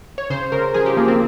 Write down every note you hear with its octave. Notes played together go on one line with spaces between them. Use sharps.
C#5
C#3 C5
C#3 A#4
F3 G#4
G4
F3 A#3
C4